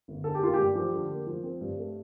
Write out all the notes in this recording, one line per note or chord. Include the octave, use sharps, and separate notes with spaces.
G1
D3 A4
G4
A#3 F4
G4
G2
F3 G4
D3
A#3
F3
C4
G2
A3